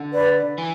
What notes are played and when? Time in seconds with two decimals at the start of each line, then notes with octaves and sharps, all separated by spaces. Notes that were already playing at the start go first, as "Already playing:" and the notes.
Already playing: D3
0.13 B4 D5
0.58 E3